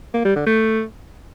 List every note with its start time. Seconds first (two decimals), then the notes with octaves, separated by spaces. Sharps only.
0.14 A#3
0.25 G3
0.36 D3
0.47 A3